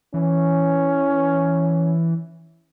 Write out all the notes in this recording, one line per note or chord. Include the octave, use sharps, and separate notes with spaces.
E3 C#4